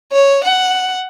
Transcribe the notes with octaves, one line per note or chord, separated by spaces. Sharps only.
C#5
F#5